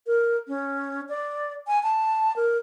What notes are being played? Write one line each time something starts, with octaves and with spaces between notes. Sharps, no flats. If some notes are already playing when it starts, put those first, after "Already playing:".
A#4
C#4
D5
G#5
A5
A#4